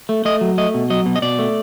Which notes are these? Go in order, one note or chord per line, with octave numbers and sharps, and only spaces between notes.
A3
A3 D#5
F#3
A3 D#5
B2
F#3 D#5
B2
D#5
B2 D5
A3